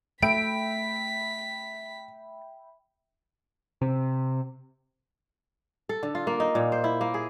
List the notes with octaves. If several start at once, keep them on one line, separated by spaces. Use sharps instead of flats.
A3 E5 G5 B5 B6 D7
C3
A4
D3
F4
A#3
D#4
A#2
C5
E4
A#3
G#4